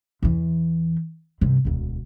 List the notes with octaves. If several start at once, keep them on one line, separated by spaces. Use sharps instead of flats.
E2 E3
G2 C3
E1 D2